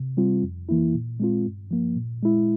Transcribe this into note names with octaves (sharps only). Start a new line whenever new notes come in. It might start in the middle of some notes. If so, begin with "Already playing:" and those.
Already playing: C3
G3 C4 F4
F2
E3 A#3 E4
A#2
G#3 C4 F4
G2
F3 A#3
A#2
G#3 E4